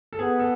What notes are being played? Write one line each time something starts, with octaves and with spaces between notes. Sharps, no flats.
A4
B3 G#4
A4